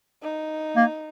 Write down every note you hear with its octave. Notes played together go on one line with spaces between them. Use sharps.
D#4
A#3